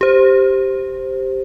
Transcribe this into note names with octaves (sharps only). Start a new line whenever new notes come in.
G4 C5